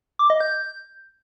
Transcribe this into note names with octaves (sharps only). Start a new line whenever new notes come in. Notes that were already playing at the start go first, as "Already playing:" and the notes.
D6
D#5
G6